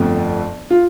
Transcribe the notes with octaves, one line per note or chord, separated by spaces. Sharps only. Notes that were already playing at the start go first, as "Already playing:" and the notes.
Already playing: G1 F2 F3 A3
F4